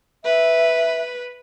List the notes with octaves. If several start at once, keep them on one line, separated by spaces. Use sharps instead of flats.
B4 E5